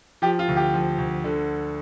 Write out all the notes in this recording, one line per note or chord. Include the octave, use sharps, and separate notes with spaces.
F3 G4
F4
D2
G4
F3
D2
D3